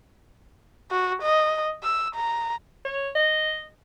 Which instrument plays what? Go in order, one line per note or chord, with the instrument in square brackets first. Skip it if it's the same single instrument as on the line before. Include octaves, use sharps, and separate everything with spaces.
[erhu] F#4
D#5
E6
A#5
[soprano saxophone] C#5
D#5